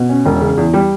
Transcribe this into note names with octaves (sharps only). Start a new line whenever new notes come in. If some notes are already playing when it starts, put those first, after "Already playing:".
Already playing: B2
C#4
E1
C#3
E2
G3